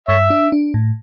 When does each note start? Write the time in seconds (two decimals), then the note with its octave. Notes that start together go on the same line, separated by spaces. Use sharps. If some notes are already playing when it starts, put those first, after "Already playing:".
0.08 G2 C#5 E5
0.30 D4
0.52 D4
0.74 A2